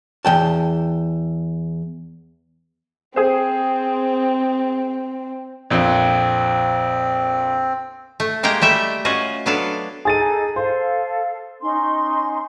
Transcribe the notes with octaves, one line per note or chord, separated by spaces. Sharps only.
E2 F3 G5 A5
C4 G#4 C5
A#1 F2 C4
A3
G#3 A#3 G4 G5 A#5
G3 A3 E5 G5
C#4 F4 F#4 D#5
F#3 B3 D4 A4 F5
D#4 G#4 A4 A6 D#7
A4 C5 F5
C#4 D#4 C6